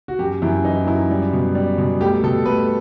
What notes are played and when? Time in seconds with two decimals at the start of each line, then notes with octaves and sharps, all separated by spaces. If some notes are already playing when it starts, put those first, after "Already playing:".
0.08 F#4
0.19 F#2 G4
0.42 F#2 E4
0.64 E3 D#4
0.87 F#2 E4
1.11 G3
1.33 B2
1.55 G3
1.78 B2
2.01 A3 G4
2.23 B2 A4
2.46 A3 B4